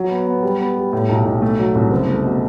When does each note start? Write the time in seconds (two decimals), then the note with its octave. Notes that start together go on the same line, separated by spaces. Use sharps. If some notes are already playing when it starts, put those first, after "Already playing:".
Already playing: F#3
0.10 B3
0.27 B3
0.43 G3
0.59 B3
0.76 G3
0.93 A2
1.09 B1
1.25 B1
1.42 A3
1.59 F#3
1.75 C2
1.91 F#1
2.08 A3
2.24 B2